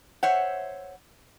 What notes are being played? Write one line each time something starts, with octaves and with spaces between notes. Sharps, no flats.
C5 C#5 E5 F#5